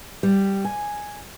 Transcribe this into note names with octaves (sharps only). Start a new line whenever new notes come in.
G3
G#5